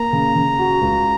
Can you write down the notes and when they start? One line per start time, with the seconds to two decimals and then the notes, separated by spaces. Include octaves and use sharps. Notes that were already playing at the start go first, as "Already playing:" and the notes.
Already playing: A#3 A#5
0.13 C#3
0.35 C#3
0.59 F#4
0.81 C#2